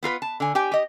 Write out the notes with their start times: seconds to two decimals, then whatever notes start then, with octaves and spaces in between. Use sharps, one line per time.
0.03 B3 F4 A#4 B4
0.22 A5
0.40 D3 G#5
0.55 G4 G5 G#5
0.72 G4 D#5